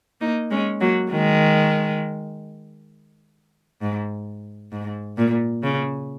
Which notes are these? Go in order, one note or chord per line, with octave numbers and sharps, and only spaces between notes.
A#3 D#4
G#3 C#4
F#3 A#3
D#3 G#3
G#2
G#2
A#2
C#3